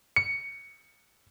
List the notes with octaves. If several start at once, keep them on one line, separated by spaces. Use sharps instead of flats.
C#7